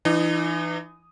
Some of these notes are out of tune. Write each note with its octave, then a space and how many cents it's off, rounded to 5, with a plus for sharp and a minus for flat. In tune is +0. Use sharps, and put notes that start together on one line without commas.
E3 +20 D#4 -35 D#6 +0